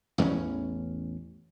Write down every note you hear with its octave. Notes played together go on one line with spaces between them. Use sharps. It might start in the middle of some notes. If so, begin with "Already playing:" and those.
A1 E2 A2 C#4